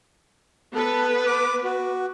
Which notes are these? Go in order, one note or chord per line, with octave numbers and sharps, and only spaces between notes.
B3 A4 B4
D6
F#4